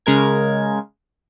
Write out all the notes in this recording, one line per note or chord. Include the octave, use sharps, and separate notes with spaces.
C#3 G#3 A#4 G#6